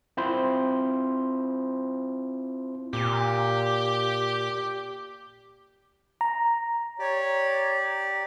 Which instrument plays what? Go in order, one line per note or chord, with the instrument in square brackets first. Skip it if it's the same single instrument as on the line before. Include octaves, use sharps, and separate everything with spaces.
[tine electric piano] C4 E4 F4 C5 B5 C6
[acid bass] A#2 [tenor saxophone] G4
[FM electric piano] A#5
[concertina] G4 D5 [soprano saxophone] C#5